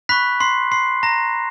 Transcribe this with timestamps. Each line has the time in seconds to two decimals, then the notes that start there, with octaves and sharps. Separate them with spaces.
0.09 B5 C#6 F#6 B6
0.40 C6 C7
0.72 C6 C7
1.03 A#5 A#6